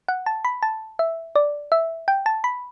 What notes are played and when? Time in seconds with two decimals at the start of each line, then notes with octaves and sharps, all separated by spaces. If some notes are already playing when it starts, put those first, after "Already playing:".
0.08 F#5
0.26 A5
0.45 B5
0.63 A5
0.99 E5
1.36 D5
1.72 E5
2.08 G5
2.26 A5
2.44 B5